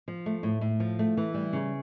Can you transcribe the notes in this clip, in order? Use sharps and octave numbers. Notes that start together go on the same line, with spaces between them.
F3
A3
A2
A2
F3
A3
E3
G3
C#3